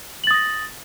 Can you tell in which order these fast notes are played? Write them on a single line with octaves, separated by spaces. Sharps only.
F#7 A6 D#6 A#6